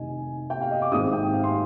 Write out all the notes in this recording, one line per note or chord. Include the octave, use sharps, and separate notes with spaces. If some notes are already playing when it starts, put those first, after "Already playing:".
Already playing: F1 D#3 D#5 G#5
G5
F5
D#5
D6
G#1 G#2 D#3 G#3 C4 D#6
G5
F5
C6